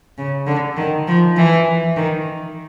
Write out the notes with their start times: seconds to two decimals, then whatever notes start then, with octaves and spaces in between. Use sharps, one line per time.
0.18 C#3
0.47 D3
0.77 D#3
1.08 F3
1.37 E3
1.97 D#3